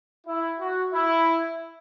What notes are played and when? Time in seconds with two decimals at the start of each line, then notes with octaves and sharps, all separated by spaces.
0.27 E4
0.59 F#4
0.93 E4